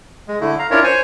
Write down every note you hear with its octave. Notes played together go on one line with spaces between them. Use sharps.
G#3
D3 A3 E4
F5 A#5
C#4 D4 E4 F4 A#4 C#5
C5 C#5 G#5 C#6